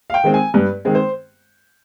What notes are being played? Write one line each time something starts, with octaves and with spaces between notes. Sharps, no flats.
F5
G5
D#3 G#3 C4
G#5
G2 B4
D#3 G#3 C4
C5